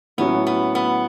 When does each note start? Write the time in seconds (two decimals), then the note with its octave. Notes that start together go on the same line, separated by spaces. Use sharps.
0.18 A2 F#3 B3 C#4 F#4
0.47 B3
0.75 B3